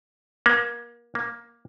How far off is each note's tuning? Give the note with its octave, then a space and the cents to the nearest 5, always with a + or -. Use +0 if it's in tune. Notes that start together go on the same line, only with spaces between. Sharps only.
A#3 +30
A#3 +10